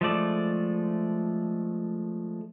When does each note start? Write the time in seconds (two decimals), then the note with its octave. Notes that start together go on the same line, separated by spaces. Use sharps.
0.01 F3 G#3 A3 D5